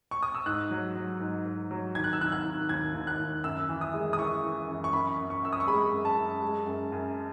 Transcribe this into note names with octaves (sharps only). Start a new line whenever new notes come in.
C#6
D#6
E6
G#2 F#6
F#3
F#3
G#2
G#2
F#3
D#3 G#6
F#6
E6
D#3 F#6
F#6
D#3
D#2 G#6
D#2
F#6
D#2
F#2 E6
E3
D#6
G#3
D#6
E3 C#6
E3
F#2
C#6
F#2 B5
F#2
C#6
F#2 E6
D#6
C#6
G#3 B5
F#2
A5
F#2
G#3
F#2
F#2